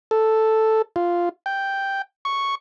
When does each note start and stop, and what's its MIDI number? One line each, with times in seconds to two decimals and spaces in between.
0.11 0.82 69
0.96 1.29 65
1.46 2.02 79
2.25 2.55 85